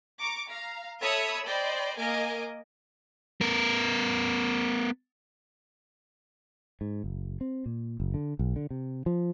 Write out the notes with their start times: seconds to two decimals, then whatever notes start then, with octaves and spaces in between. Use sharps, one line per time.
0.19 A#5 C#6 D6
0.49 F5 A#5
1.01 A4 C#5 E5 B5 D#6 E6
1.46 C5 D5 D#5 G5 B5
1.97 A#3 A#4 D#5 G#5 D6
3.41 B3 A#4
6.81 G#2
7.04 F#1
7.41 C4
7.66 A#2
8.00 F#1
8.14 D3
8.39 B1
8.56 D3
8.70 C3
9.06 F3